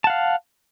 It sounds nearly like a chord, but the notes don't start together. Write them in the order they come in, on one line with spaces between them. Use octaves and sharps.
A5 F#5 F5